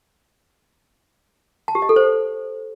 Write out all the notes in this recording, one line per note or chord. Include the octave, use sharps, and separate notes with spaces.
A5
G4
D#5
A4
C5